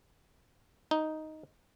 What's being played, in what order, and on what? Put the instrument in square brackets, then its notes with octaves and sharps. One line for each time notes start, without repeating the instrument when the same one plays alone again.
[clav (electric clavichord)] D#4